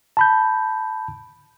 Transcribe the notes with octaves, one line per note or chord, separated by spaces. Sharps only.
A5 B5 G6